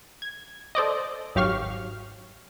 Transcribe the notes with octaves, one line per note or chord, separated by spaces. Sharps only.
G#6
A4 C5 D5 D#5
G#1 F#3 G4 F5 C#6 F6